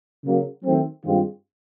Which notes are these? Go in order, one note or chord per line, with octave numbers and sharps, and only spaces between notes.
C#3 F#3 A#3
D#3 F#3 A3 C4
G2 D#3 G#3 C4 F4